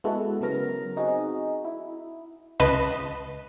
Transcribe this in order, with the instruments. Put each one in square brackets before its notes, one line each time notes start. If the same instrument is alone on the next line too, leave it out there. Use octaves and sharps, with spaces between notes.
[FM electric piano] G#3 B3 E4 F#4 A4
C#3 F#3 B3 A#4 A#5
C4 D#4 F#4 G#4 D#5
E4
[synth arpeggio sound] C#2 B4 D#5 A5